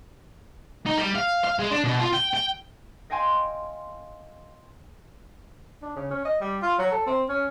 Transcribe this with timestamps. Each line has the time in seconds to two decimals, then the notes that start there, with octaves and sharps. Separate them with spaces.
0.86 D#4
0.97 G3
1.15 F5
1.44 F5
1.59 G#3
1.71 D4
1.84 B2
2.00 F4
2.14 G5
2.34 G5
3.10 D#5 F5 G5 G#5 C6
5.82 D4
5.96 C#3
6.11 C#4
6.25 D#5
6.41 G3
6.62 F4
6.78 F#3
6.91 A4
7.06 C4
7.29 C#4